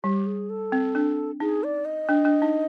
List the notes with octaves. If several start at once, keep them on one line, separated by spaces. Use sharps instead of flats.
G3 G4
G#4
A4
C4
D4
D#4 G#4
D5
D#5
D4
D4
D#4